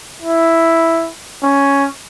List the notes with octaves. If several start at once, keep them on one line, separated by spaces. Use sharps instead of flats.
E4
C#4